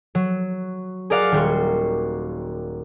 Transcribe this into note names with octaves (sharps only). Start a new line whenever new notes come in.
F#3
G#4 A#4 D5 F5 F#5
D#1 G3 F#4 C6